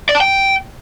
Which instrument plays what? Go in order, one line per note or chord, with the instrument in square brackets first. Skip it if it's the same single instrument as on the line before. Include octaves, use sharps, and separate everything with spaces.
[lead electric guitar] D5
A5
G5